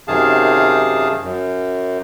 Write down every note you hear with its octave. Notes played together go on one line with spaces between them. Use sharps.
F#2 C3 D#3 G#4 F5 A5
F#2